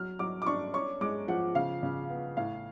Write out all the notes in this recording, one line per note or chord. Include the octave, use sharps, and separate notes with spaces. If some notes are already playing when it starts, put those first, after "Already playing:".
Already playing: F#3 F6
F#3 D6
D6
D4 C#6
C#4 C#6
G#3 D6
F3 F#5
C#3 F5
C#3
B3
A2 F5